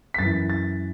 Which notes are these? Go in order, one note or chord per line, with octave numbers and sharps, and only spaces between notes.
B6
F#2 E3 A6
A6